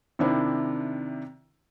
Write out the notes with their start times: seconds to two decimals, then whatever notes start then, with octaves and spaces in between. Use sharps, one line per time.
0.19 C3 D#3 D4 E4